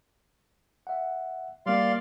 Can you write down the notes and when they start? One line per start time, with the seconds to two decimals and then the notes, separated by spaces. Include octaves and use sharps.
0.87 E5 F#5
1.66 G3 A#3 D5 F5 C6